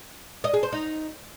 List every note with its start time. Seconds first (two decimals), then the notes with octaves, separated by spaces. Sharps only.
0.44 D#5
0.53 G#4
0.63 C5
0.72 D#4